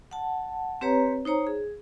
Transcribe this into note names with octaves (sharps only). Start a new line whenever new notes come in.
F#5 A5
C4 G4 B4 C#5 A#5
D#4 C5 C#5 A#5
G#4